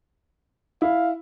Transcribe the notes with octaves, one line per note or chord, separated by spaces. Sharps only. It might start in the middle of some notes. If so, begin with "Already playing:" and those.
E4 F5